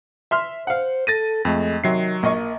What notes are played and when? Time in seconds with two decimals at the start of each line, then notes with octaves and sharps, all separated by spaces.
0.31 E5 C6 F6
0.67 C5 F5 F#5
1.07 A4 A6 A#6 D#7
1.45 F2 G#3 A3
1.84 C3 D#3 F#3 C7
2.23 A#1 A#3 D#5 C#6